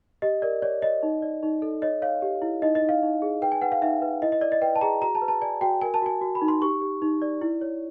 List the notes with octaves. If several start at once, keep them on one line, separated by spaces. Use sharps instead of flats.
G4 D#5
A#4 D5
C#5 D5
C#5 D#5
D#4
D5
D#4
A4
C#5 D#5
C#5 F5
G4
E4
D#4 D#5
D#5
D#4
F5
D#4
G#4
B4 G5
G#5
B4 F#5
F5
D#4 E5
B4
E4 D#5
D#5
D5
D#5
B4 G5
A5
G#4 A#5
F#4 A#5
A5
B4
A5
D5 G#5
F#4 G5
A#4 G#5
A5
F#4 G#5
F#4
B5
D#4
C6
G4 C#6
G4
D#4
D5
E4
C#5